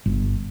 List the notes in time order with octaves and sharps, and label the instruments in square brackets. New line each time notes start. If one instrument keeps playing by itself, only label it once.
[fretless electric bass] G1